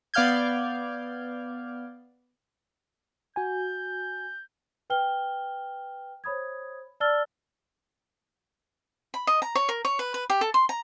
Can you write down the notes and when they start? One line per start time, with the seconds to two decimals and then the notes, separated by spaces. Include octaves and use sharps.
0.14 B3 D5 F5 F6 G6 G#6
3.36 F#4 G#5 G6
4.90 B4 G5 F6 G7
6.24 C5 C#5 B5 D#6 G#6
7.00 D5 A5 E6 F6 A6 G7
9.14 B5
9.27 D#5
9.42 A#5
9.55 C#5
9.69 A#4
9.85 C#5
9.99 B4
10.14 B4
10.30 G4
10.41 A4
10.54 C6
10.69 A#5